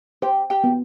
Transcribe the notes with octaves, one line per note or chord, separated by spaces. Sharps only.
G4 C5 G5
G4 G5
B3